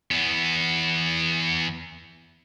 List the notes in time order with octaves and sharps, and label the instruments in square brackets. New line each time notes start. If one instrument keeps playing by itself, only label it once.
[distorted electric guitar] E2 B3